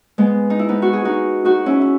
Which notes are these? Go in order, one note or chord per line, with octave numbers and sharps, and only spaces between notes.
G#3 B3
D#4
E4
B3 D#4
F#4
G#4
D#4 F#4
D#4 F#4
C#4 E4
E4